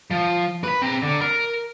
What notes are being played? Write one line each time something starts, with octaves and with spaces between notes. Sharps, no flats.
F3
B4 B5
C4 A#5
D3
A#4